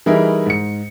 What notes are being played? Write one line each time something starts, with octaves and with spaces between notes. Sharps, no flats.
E3 G3 D#4 E4 G#4 A#4
G#2 C#7